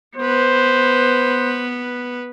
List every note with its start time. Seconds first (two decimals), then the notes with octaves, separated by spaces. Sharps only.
0.17 B3 B4 C5